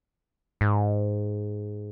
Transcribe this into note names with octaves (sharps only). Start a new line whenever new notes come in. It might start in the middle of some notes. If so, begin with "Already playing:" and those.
G#2